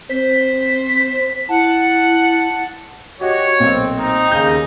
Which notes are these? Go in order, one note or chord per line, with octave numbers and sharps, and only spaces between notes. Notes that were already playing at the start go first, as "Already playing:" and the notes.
C4 C5 B6
E4 F#5 A5
F#4 G4 C#5 D#5
B1 A#2 C4
D#4
D#2 C#3 D#6 G6